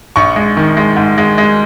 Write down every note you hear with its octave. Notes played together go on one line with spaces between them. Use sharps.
A#1 C#6
G#3
D#3
G#3
G#2
G#3
G#3